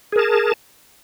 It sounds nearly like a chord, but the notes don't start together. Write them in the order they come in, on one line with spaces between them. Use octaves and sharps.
G#4 A#4 A5